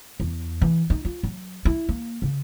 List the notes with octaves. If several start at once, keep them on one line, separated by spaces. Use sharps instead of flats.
E2
E3
D#4
F4
F#3
E4
A#3
C#3